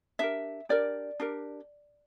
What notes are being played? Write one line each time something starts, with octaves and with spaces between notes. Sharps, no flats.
D4 G4 A#4 E5
D4 G4 A#4 D5
D4 G4 A#4